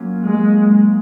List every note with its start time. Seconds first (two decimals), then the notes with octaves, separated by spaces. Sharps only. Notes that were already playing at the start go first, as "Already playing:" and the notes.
Already playing: F#3 A#3 C#4 F4
0.25 G#3